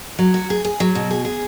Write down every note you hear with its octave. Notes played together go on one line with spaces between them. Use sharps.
F#3
F#4
G#4
G#4
F#3
B2
G#4
G#4